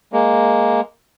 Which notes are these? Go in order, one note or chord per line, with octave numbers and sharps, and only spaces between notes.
G#3 A#3